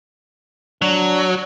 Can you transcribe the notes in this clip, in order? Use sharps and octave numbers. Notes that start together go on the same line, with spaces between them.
F#3 D4